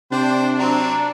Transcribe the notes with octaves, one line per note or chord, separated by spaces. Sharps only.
C3 D4 C5 G5
F#3 C4 A#5